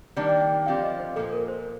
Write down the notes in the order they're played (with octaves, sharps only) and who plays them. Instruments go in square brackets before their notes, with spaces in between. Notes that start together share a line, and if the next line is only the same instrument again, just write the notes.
[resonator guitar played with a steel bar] D#3 G3 A#3 D4 [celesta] D5
[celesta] G5
G5
G5
[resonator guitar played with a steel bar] D3 F3 C4 G4 [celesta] F5
[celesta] D#5
C5
[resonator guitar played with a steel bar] A#2 F3 A#3 [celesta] A4
[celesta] A#4
C5